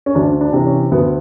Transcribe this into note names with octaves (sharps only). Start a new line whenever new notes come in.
C#4
D2 D4
D4
C3 E3
C#4
D2 B3